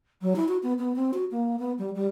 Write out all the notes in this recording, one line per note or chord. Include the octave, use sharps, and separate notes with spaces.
F#3
E4
F#4
B3
B3
C4
F#4
A#3
B3
G3
G3